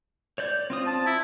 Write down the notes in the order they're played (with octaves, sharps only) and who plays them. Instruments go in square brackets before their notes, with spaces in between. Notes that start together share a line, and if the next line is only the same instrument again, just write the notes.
[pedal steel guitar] C#5 D5 G6
C4 F4 D#6
[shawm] A5
E4